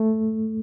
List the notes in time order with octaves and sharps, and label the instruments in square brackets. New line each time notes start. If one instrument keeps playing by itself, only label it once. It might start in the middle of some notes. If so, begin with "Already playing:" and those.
Already playing: [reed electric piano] A3